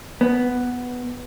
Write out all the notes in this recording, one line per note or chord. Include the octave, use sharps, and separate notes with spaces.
B3